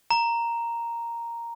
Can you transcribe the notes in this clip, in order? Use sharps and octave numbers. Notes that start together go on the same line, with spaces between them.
A#5